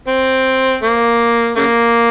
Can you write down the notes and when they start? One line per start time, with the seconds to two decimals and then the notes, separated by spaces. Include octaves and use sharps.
0.08 C4
0.83 A#3
1.57 C#3 A#3